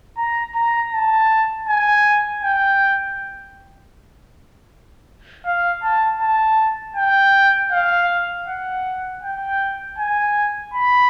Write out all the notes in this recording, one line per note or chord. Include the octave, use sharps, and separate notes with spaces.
A#5
A#5
A5
G#5
G5
F5
A5
A5
G5
F5
F#5
G5
G#5
B5